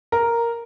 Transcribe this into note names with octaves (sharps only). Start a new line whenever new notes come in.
A#4